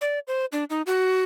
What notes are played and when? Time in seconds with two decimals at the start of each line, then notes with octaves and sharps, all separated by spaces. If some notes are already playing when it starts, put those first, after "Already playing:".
0.01 D5
0.27 C5
0.52 D4
0.70 D#4
0.86 F#4